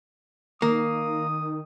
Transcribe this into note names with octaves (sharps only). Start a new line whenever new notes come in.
D#3 A#3 D#6